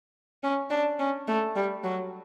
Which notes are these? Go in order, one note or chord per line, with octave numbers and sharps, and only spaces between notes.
C#4
D4
C#4
A3
G3
F#3